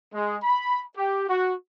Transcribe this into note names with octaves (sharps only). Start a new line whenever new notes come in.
G#3
B5
G4
F#4